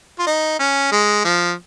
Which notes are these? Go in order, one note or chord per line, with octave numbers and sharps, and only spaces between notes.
F4
D#4
C#4
G#3
F3